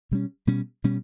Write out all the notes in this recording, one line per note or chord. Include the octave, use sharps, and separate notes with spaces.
B2 G3 C#4
B2 G3 C#4
B2 G3 C#4